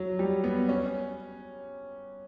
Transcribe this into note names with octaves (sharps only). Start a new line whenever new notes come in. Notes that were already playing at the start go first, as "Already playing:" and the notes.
Already playing: F#3
G3
B3
C#4